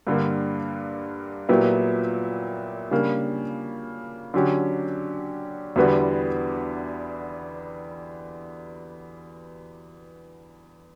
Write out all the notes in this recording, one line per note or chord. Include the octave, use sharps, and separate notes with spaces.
G2 D3 G3 A#3
A#2 F#3 B3 E4 G4
C#3 G3 A#3 D4
D3 F#3 C#4 G4
E2 D3 G3 B3 F#4